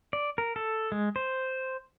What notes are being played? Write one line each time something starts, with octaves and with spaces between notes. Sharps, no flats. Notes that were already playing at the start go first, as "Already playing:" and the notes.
D5
A#4
A4
G#3
C5